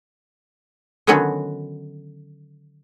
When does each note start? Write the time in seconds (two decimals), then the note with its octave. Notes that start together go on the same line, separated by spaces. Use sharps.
1.07 D3 D#3 F#3 B3 C#4 F#4